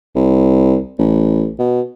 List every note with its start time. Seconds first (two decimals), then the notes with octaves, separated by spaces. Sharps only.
0.15 C2
0.99 A1
1.59 B2